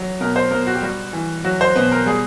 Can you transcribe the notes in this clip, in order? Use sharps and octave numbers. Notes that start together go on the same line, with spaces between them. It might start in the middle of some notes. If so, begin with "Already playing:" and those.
Already playing: F#3
B2 A#4
C5
B2 A#4
F#4
G4
G3 F#4
E3
F#3 F#4
C5
B2 B4
A#4
G3 G#4